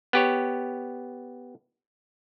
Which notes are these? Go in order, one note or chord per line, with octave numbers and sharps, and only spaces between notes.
B3 G4 C#5